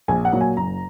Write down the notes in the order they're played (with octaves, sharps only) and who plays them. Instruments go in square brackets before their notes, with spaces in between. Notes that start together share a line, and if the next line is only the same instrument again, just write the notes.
[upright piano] A#1 G#5
F#5
A#2 F#3 A#3
G#5
F#1 A#5